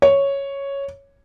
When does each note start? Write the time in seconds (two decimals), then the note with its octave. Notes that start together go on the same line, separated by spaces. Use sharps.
0.02 C#5